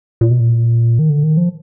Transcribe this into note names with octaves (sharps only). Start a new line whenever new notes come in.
A#2
B2
A#2
D#3
D3
D#3
F3